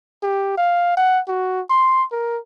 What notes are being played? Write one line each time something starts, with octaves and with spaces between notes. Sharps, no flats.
G4
F5
F#5
F#4
C6
A#4